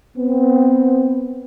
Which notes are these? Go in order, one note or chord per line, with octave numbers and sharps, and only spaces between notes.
B3 C4